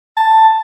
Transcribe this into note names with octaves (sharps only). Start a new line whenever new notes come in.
A5